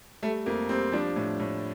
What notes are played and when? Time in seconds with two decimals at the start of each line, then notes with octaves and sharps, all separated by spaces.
0.23 G3 A3
0.46 F2 A#3
0.69 G3 C4
0.92 F3 D4
1.16 A2
1.39 A2